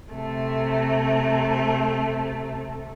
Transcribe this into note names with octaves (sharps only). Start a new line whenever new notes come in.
C3 A3